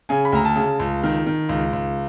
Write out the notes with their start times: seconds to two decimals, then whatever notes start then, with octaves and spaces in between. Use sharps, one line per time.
0.09 C#3 G#5
0.25 B5
0.32 D2 A#5
0.45 A5
0.56 C#3
0.80 C#2
1.03 D#3
1.26 D#3
1.49 C#2
1.73 C#2